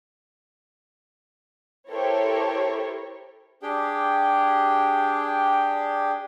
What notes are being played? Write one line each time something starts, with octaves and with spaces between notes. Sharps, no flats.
E4 G4 A4 A#4 C5 C#5
D4 G4 G#4 G5